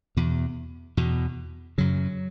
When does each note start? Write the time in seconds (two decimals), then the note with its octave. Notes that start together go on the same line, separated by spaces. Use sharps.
0.17 E2 B2
0.97 E2 B2
1.78 F#2 C#3 F#3